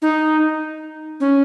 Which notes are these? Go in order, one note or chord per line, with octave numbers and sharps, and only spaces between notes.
D#4
C#4